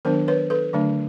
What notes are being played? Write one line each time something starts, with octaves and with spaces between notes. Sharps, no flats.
D#3 F#3 B3 D4 A#4 C5
B4 C#5
A4 B4
D3 F#3 A3 D4